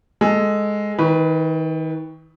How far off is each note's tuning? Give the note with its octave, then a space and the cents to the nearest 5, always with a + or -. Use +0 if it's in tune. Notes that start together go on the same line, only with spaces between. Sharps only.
G#3 +0 A4 +0
D#3 +35 B4 +5